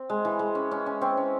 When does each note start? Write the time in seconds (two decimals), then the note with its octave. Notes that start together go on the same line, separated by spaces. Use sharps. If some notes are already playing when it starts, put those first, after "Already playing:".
Already playing: C4
0.10 G#3
0.25 E3
0.39 G#3
0.55 C#4
0.71 C#4
0.86 C#4
1.01 C4 C#4
1.17 C#4